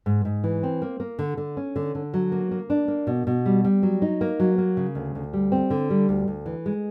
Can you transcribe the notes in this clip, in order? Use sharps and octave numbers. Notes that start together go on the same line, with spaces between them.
G#2
G#2
E3
C4
A#3
A#3
D3
D3
C#4
D3
D3
F#3
A#3
A#3
D4
A#3
B2
B2
G3
G3
F#3
D#4
A#3
F#3
A#3
C#3
D2
D2
G3
C4
D3
G3
D2
D2
E3
G#3